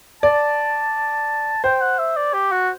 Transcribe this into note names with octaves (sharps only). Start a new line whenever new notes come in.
D5 A5
C5 G5
F#5
E5
D5
G4
F#4